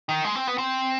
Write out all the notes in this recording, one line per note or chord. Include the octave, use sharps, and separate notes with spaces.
D#3
G#3
C4
B3
C4